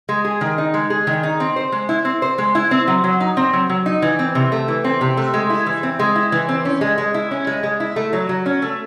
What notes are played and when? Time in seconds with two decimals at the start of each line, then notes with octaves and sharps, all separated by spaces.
0.09 G#3
0.25 G#4
0.41 D#3
0.58 D#4
0.74 G#3
0.90 G#4
1.07 D#3
1.23 D#4
1.40 C4
1.56 C5
1.72 G#3
1.89 E4
2.05 C4
2.22 C5
2.38 G#3
2.55 E4
2.71 C4
2.88 F#3
3.04 F#3
3.20 D#4
3.37 C4
3.53 F#3
3.70 F#3
3.86 D#4
4.02 E3
4.19 C4
4.35 C3
4.52 A3
4.68 E3
4.84 C4
5.01 C3
5.17 A3
5.34 G#3
5.50 E4
5.66 E3
5.83 C4
5.99 G#3
6.15 E4
6.32 E3
6.49 C4
6.65 C#4
6.81 G#3
6.98 G#3
7.14 E4
7.31 C#4
7.47 G#3
7.63 G#3
7.80 E4
7.96 A3
8.13 F#3
8.29 F#3
8.46 C#4
8.62 A3